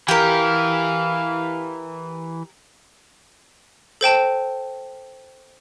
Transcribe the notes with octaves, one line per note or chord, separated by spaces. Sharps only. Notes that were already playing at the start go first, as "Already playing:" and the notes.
E3 G4 A#4 F5
A4 C5 G5 A5